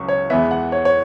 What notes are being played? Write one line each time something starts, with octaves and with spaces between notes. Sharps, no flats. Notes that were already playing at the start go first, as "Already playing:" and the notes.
Already playing: C#2 C#3 F#3 C#6
C#5
E2 E3 G#3 B3 E5
F#5
C#5
C#5